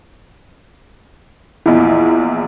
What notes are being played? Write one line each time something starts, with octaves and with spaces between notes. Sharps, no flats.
A#1 E2 E4 D#5